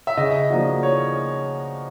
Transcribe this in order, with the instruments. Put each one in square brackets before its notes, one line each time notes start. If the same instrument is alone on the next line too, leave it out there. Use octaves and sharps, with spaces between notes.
[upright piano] E5
[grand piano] C#3 [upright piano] D#5
[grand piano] F3 A#3 D4 F#4
[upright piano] C#5